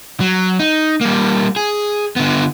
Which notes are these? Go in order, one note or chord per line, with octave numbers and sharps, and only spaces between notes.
F#3
D#4
G3 A#3
G#4
D3 B3